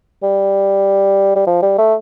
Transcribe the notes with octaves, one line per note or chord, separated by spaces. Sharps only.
G3
G3
F3
G3
A3